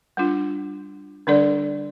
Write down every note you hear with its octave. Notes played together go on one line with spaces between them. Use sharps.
G3 D4 F4
D3 G3 D4 A4 D5